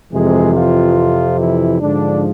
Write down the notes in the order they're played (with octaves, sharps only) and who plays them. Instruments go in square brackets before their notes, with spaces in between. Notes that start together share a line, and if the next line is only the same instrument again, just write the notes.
[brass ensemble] F2 C3 E3 G#3 G#4
F3 F4
E3 E4
G#2 D3 F3 D4